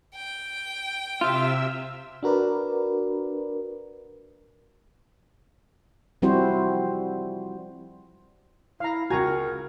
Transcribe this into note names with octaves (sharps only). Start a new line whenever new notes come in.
G5
C3 F4 E5 E6
D4 F#4 A#4 B4 D5
F3 G3 C4 E4 F#4 C5
E4 F5 A#5
C#2 F#4 A#4 G#5 A#5 G#6